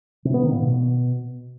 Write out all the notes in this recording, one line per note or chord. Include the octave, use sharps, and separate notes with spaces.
C3
B3
D#3
A#2
B2